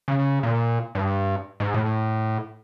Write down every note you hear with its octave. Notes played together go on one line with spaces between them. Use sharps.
C#3
A#2
G2
G#2
A2